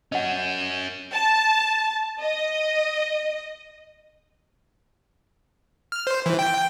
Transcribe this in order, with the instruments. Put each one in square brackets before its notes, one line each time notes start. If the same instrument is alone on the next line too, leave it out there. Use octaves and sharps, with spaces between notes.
[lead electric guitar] C#4 F#4 [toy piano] D#5 F#5
[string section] A5
D#5
[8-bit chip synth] F6
C5
E3
G5